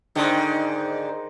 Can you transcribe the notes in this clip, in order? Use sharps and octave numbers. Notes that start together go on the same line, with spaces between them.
G#2 D3 D#3 D#4 C5